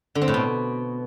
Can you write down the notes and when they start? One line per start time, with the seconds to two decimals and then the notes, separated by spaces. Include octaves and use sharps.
0.15 D3
0.22 C4
0.28 A2
0.34 B2